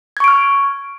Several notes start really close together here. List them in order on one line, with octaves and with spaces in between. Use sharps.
G#6 C#6 D7 F6